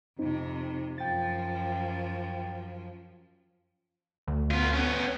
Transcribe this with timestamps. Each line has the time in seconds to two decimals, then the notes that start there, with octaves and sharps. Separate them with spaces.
0.19 F2 C3 C4 D#4
0.98 F#2 F3 G5 A6
4.27 D2
4.51 B3 F4
4.73 B3 C#4